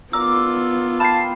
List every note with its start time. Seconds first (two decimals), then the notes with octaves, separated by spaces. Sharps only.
0.13 B3 F4 A#4 D5 D6 E6
1.00 F5 G5 A5 B5 C7